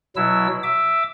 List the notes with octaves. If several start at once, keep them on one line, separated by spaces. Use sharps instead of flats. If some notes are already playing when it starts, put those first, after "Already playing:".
B2 F#3 E4 E6
E5 D6